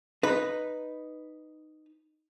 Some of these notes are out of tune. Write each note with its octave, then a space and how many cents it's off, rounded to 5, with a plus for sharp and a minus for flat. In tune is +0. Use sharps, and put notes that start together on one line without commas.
D#4 -5 B4 +0